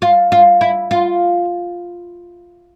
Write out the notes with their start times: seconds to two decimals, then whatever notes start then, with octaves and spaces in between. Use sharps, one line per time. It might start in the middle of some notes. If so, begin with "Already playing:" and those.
0.02 F4
0.32 F4
0.61 E4
0.91 F4